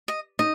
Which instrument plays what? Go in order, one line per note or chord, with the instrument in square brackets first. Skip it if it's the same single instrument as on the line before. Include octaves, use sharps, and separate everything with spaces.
[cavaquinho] D#5
[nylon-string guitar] D#4 [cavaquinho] D#5